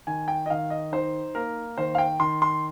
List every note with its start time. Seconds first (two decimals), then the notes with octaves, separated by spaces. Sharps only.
0.07 D#3 G#5
0.28 G5
0.46 D#5
0.50 D#3 F5
0.70 D#5
0.92 D#4 C5
1.35 A#3 A#4
1.78 D#3 C5
1.95 F5
1.98 G5
2.20 D#3 C6
2.42 C6